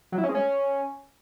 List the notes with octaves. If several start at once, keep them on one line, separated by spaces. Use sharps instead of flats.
F#3
E4
C#4
G#3
C#4